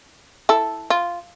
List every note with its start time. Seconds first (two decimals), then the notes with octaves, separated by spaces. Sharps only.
0.49 E4 A4
0.90 F4